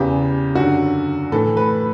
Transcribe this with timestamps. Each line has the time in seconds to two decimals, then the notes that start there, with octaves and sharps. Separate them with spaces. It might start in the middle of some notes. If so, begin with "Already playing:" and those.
Already playing: E2 C#3 E3 G4
0.55 F#2 D3 F#4
1.32 A2 E3 A4
1.57 B4